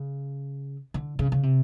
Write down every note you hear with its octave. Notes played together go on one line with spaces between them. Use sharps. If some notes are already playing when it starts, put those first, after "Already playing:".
Already playing: C#3
D3
C#3
C#3
C3